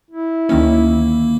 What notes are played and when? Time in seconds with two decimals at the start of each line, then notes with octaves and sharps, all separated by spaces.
0.11 E4
0.49 D2 D#3 A#3 C#4